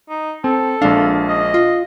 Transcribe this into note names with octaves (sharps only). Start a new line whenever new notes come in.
D#4
C4 A4
A#1 G#3 D4 F5
D#5
F4